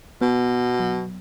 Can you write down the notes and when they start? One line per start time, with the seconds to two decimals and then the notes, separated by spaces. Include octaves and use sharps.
0.21 B2 B3
0.80 F#3